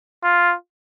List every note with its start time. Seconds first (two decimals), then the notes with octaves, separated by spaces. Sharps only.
0.23 F4